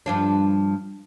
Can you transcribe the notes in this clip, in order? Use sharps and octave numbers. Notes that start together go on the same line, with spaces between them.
G2 F3 D4